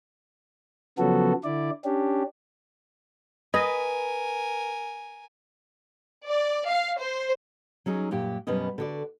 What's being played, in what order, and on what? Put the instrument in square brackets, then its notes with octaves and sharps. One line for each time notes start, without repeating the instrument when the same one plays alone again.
[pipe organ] C#3 F3 F#3 B3 F#4 A4
D3 E4 D5
C#4 D4 G4
[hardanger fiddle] A#4 G#5 [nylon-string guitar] B4 [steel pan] D#5
[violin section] D5
F5
C5
[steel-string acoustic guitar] F#3 C#4 D#4 G#4
F#2 A#2 G4
F#2 B2 G3 B3 C#4 D#5
D3 F#4 D5